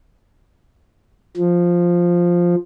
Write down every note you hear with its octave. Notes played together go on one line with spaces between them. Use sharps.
F3